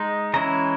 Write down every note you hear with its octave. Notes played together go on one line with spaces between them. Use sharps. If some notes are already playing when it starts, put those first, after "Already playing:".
Already playing: G#3 D#4
E3 G#3 C#4 E4 A#5